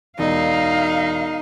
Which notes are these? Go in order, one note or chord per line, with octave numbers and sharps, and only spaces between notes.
E1 D#4 F5